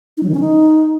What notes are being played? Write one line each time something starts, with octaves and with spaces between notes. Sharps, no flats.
D#4
F#3
D#3
C#4
D#4